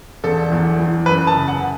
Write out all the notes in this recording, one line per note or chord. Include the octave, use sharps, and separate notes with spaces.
E1 A4
E2
E3
F#2 B4
A5
C#3
F#5